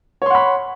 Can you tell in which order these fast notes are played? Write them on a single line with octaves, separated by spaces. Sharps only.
C#5 C6 F#5 B5